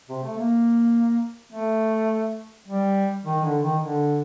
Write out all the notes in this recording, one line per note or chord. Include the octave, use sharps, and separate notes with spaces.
C3
A3
A#3
A3
G3
D#3
D3
D#3
D3